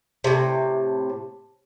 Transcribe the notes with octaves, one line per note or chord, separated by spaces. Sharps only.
A2 C3